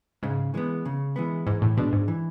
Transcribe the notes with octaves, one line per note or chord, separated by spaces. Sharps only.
G#2 C#3
E3 G#3 B3
C#3
E3 G#3 B3
G#2 E3
A2
B2 G#3 D4
G#2
E3